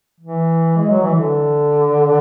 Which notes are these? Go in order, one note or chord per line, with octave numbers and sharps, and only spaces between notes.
E3
G#3
F#3
E3
D3